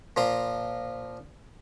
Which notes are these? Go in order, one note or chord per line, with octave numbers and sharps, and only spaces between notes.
A#2 F3 A#5 C6